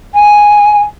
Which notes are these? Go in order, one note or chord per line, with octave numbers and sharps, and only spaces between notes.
G#5